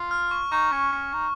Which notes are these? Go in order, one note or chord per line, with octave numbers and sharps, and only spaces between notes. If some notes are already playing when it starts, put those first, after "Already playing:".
Already playing: F4
F6
C#6
D#4 C#6
C#4
C#4
D#4